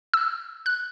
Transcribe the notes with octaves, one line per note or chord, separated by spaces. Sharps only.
E6
F#6